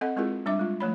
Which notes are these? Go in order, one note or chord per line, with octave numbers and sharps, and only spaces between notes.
C4 A4 D#5 F#5
G#3 C4 E4 F4 G#4 A#4
G3 D4 E5 D6
G#3 F4
F3 A3 C#5 B5